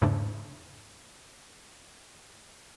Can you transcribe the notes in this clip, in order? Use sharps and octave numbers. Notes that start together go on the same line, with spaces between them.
E2 G#2 C#3 A3 D4